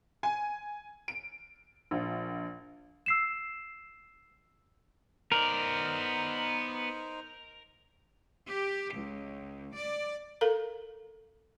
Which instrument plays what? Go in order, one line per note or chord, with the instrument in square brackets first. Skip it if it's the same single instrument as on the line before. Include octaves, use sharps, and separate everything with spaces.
[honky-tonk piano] G#5
D7
A#1
[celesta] E6 C7 E7
[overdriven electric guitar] B3 D5 [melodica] D#4 C5 [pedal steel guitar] A#4
[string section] G4
C#2
D5
[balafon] A4 A#4 F5 A#5